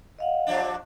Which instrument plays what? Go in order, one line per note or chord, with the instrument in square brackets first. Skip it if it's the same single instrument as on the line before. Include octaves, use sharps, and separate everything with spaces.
[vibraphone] D#5 F5 F#5
[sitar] G2 F3 D4